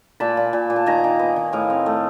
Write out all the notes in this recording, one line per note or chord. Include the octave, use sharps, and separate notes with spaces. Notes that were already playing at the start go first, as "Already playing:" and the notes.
A#2 A5 B5
A#2
A#2
A#2
A5
D#3 G#5 A#5
D#3
B3
D#3
A2 D#5 F5
C4
A3